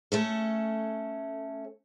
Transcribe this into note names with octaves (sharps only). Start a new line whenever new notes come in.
A3 C#4 A4